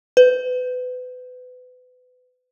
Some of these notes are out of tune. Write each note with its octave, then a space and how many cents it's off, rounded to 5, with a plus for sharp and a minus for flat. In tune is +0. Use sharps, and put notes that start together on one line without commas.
B4 +30